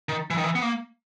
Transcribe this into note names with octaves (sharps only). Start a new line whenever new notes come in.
D#3
E3
D#3
E3
B3
A#3